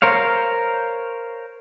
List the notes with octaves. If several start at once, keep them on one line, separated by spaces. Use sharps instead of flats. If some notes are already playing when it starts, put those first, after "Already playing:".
A#4 C5 C#5 F5